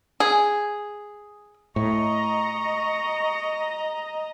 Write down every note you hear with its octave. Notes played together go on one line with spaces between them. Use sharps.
G#4
A2 D#5 A#5 C#6